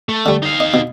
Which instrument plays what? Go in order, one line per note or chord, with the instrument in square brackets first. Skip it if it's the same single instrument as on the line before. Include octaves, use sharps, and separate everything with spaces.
[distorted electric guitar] A3
[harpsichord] D3 G3
[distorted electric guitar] D#4 F5
[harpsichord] D#5
B2